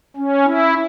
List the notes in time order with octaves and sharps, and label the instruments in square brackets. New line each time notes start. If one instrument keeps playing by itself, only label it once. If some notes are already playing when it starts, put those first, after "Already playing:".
[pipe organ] C#4
E4